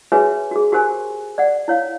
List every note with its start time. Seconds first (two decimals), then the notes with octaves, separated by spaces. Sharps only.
0.12 F#4 G#4 B4 C#5 E5 G#5
0.51 F#4 G#4
0.72 F#4 G4 A#4 C5 G#5
1.38 D5 F#5
1.68 E4 C#5 F5